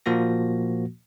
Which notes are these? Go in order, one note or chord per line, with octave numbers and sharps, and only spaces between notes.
A#2 F3 A#3 F#4 A#6